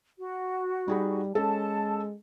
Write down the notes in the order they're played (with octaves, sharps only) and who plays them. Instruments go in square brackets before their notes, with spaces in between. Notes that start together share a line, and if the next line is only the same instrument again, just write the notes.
[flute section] F#4
[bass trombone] G3 [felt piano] D#4 G#4 B5
[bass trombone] G#3 [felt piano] C#4 A4 [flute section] A5